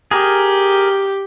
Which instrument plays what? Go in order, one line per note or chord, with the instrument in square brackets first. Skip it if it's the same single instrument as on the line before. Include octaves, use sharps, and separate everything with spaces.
[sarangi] G4 [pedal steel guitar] G#4 A#4